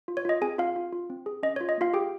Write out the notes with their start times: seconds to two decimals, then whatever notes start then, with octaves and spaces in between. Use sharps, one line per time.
0.08 F4
0.17 C#5
0.25 F4 D#5
0.42 C4 G#4 G#5
0.58 C4 F4 F5
0.76 F4
0.93 F4
1.10 C4
1.26 G#4
1.43 C#4 D#5
1.56 F4 C#5
1.69 D#5
1.78 A#3 F4 F5
1.93 G4 G#4 G5